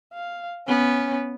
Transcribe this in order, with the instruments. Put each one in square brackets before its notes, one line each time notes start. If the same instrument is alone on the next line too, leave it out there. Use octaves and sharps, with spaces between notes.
[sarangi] F5
[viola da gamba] B3 [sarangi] C#4